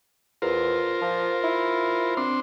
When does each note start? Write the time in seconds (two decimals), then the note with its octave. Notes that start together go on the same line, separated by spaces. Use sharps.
0.42 E2 F4 A#4 C5
1.01 F3
1.44 E4
2.17 C4 D4 C6